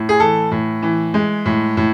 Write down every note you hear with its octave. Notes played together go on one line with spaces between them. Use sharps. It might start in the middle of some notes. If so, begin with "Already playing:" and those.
Already playing: A2
G#4
E3 A4
A2
E3
G#3
A2
A2